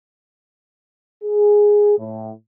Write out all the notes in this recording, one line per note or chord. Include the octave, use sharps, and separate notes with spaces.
G#4
A2